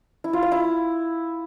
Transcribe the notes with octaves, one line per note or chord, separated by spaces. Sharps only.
E4
F4
F5
E4